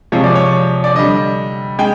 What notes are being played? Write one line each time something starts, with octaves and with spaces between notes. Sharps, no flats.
C3 F3 G#3 C#5
D5
C#5
D5
D3 G3 D#5
G#3 G5